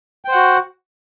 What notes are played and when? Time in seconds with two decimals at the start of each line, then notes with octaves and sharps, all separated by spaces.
0.25 G5
0.28 C5
0.32 F#5
0.35 F#4